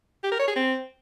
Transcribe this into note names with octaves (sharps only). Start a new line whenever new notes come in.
G4
A#4
C#5
G#4
C4